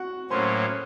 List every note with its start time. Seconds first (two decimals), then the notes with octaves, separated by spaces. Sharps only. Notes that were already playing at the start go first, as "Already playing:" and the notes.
Already playing: F#4 F#5
0.30 A2 F#3 A#3 C#4 C5 C6